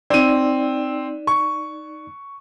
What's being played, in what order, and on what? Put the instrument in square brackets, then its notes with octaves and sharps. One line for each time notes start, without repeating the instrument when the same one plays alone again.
[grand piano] C4 D#7 [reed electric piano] D#4 D5
[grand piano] C#6